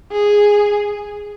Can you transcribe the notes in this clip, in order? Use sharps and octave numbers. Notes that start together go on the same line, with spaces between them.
G#4